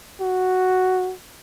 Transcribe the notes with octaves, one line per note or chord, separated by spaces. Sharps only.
F#4